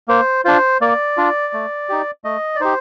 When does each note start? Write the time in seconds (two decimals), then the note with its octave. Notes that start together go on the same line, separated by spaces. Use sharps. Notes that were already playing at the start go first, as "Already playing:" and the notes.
0.08 A#3 C5
0.45 D4 F4 C5
0.81 A#3 D5
1.17 D4 F4
1.53 A3
1.89 D#4 G4
2.24 A3 D#5
2.55 D5
2.60 D#4 G4 C5